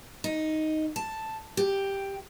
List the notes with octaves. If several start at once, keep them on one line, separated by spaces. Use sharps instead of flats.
D#4
A5
G4